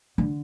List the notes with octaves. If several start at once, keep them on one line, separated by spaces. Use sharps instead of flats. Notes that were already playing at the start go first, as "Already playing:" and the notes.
D3